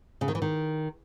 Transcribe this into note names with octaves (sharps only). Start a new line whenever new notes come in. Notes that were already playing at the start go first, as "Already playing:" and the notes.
C#3
D#3
E3
D#3